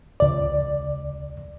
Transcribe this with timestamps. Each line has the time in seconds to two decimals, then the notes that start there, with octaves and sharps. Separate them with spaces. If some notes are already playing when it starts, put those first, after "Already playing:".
0.20 C#2 D5